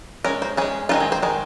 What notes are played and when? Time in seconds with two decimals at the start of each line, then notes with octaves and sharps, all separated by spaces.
0.25 G#3 C#4 A#4
0.42 C5
0.57 G#3 C#4 G#4
0.89 D#3 G#3 C4 D#4 F4
1.00 G#4
1.12 C5
1.22 D#3 G#3